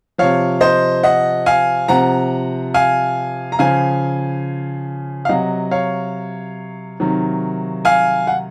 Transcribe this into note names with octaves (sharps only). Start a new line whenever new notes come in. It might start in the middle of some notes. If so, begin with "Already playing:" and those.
C3 F3 C#5 F5
C5 D#5
D#5 F#5
F5 G#5
C3 F3 F#5 A#5
F5 G#5
A#5
C#3 F3 F5 G#5
F5
C3 F#3 D#5 F#5
C#5 F5
C3 D#3 F#3
F5 G#5
F#5